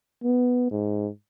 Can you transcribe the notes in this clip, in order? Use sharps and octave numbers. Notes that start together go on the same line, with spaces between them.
B3
G#2